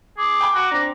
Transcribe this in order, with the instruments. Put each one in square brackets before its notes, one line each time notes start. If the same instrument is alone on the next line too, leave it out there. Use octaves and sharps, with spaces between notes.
[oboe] G#4 [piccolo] D6
[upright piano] G5 G#5 B5
[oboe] F#4
[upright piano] C4 D4 [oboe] A#5